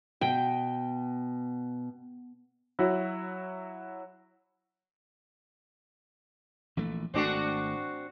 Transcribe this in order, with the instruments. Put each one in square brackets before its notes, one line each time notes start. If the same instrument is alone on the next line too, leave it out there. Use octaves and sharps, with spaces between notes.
[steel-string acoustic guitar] B2 [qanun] G5
[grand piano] F#3 E4 F#4
[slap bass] A#1 E3 A3
[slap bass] G#1 A3 [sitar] C4 D4 F#4